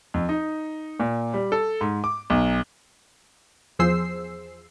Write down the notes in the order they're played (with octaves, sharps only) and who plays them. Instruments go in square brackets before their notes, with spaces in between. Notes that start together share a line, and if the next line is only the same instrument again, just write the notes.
[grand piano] F2
D#4
A#2
G3
A4
G#2
D6
B1
[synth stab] E2 F3 G#4 C5 E6 C7